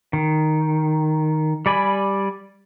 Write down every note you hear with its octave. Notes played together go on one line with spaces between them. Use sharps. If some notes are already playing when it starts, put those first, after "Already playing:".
D#3
G3 D5 G#5 B5